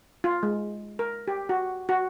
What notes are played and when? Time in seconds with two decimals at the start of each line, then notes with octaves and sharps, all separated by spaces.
0.24 F4
0.43 G#3
0.99 A#4
1.28 G4
1.49 F#4
1.89 F#4